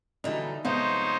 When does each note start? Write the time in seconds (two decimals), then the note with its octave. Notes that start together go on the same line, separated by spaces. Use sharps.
0.24 D3 E3 F#3 G3 D#4
0.65 C2 F3 G#3 B3 D#4 C5 C#5 C6